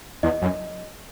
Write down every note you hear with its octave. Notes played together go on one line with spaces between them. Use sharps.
E2 D#5
F#2